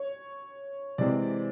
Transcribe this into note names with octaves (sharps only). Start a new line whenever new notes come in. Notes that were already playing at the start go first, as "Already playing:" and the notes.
Already playing: C#5
C3 E3 G#3 C4 D5